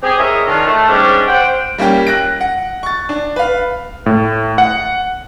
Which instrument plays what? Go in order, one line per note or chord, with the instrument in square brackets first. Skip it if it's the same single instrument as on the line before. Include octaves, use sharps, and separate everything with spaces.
[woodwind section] C4 G4 G#4
E4 G#4 A#4 C#5 D#5 E5
D#3 C#4 D4 F4
A3
G#2 G3 C#4 D4
C5 F#5 G5
[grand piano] G3 A#3 C#4 G4
F#6 A#6 D7
F#5
C#6 A6
D4
B4 F5
[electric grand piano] A2
F#5